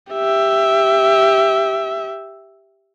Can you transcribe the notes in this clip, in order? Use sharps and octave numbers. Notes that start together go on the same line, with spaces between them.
G4 E5